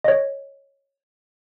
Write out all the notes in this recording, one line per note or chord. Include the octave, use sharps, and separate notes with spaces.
C#5 D#5